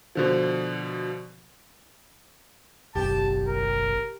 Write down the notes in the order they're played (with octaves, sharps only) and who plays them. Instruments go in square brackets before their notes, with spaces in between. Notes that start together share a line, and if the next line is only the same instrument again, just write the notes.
[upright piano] B2 D3 F3
[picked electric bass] F#1 B1 [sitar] G4 [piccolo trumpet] A5
[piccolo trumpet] A#4